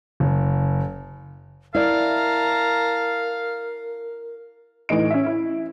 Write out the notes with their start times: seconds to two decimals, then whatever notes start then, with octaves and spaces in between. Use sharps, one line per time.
0.20 F#1
1.75 E4 A#4 D5 F5 A5 A#5
4.89 A2 E3 D#4 D7
5.10 C#4 E5
5.26 E4